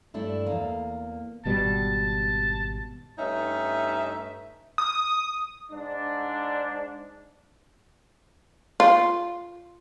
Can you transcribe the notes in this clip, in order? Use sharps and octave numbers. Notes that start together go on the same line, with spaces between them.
G2 A3 D4 E4
E2 A#3
G#1 B2 G3 A5
G2 A3 C#4 D#4 E5
D#6
G#2 D4
F4